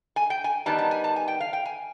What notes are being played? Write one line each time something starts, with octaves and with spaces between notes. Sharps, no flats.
G#5
G5
G#5
D#3 G3 B3 D#4 A5
A5
G#5
A5
G#5
G5
F5
G5
G#5